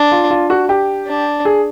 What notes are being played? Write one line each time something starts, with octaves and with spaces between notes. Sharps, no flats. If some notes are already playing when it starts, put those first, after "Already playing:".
Already playing: D4
F4
F4
F#4
G4
D4
G#4